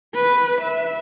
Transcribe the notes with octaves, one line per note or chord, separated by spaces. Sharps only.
B4
E5